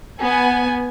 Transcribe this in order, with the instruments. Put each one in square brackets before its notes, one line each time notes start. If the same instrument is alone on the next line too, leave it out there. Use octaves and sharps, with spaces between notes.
[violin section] B3 G#5